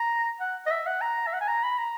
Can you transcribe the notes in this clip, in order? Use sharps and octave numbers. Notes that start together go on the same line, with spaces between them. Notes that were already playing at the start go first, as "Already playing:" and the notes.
Already playing: A#5
F#5
D#5
E5
F#5
A#5
E5
F#5
G#5
A#5
B5
A#5